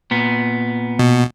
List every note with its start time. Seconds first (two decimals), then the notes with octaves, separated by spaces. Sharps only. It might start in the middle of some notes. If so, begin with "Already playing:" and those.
0.11 A#2 B3
0.99 B2